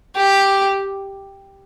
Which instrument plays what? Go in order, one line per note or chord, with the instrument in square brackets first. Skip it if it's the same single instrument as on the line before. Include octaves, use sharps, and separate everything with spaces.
[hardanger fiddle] G4